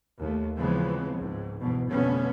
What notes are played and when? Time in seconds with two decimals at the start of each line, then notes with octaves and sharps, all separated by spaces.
0.19 D#2 A3
0.57 C#3 E3 F3 G#3 B3 C4
1.16 C#2 G#2
1.60 G1 E2 G#2 B2
1.90 F2 B2 D3 A3 B3 C#4